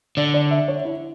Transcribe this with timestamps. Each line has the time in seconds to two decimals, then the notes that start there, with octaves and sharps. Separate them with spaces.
0.17 D3 D5
0.34 D5
0.51 E5
0.68 C#5
0.85 E4